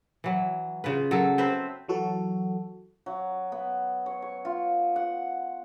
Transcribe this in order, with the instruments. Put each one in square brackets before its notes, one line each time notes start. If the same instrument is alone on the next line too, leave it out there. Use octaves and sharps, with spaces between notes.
[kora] E3 F#3
C#3 F4 B4
F#3 A4 A#4
C4 B4 C5 E5
[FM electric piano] E3 F#3 F#4 A4
[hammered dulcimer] F#3
B3
C#5
C#5
F4
F#5